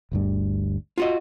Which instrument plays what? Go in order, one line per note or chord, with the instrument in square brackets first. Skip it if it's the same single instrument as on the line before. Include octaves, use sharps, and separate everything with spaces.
[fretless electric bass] G1 D2 G2
[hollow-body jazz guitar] F4 F#4 D#5